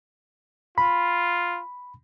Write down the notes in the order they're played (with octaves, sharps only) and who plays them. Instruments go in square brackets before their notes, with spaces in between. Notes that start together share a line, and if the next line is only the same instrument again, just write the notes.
[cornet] F4 [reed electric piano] B5